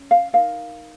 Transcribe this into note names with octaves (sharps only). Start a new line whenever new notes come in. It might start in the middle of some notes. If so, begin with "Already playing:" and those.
Already playing: C#4
F5
D#4 A#4 F5